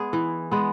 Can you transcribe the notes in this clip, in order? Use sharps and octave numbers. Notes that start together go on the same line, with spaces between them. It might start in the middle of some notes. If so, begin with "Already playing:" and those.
Already playing: G#3 B3 G#4
E3
G#3 B3